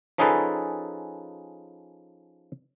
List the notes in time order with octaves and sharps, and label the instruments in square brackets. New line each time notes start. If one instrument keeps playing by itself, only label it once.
[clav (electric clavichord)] F3 C#4 D#4 G#4 A4 B4